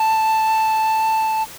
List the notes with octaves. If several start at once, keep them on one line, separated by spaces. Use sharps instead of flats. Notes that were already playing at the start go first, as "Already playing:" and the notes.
Already playing: A5